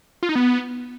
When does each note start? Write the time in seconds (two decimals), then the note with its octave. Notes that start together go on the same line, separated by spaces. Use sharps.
0.23 F4
0.29 D#4
0.35 B3